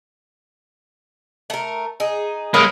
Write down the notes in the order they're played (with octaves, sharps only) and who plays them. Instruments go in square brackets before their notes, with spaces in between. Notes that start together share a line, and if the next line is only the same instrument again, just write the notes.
[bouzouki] A3 A#4
D#4 G#4
[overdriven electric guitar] G#3 A#3 [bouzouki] A#4 B4 C#5 [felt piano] B5 D#6 F6